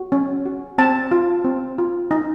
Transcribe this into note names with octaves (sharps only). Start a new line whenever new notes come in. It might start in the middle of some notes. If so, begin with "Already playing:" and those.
Already playing: F#4
C#4
F#4
C4 A5
F4
C4
F4
D#4